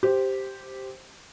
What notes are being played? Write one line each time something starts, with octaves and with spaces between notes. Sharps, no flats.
G4 C5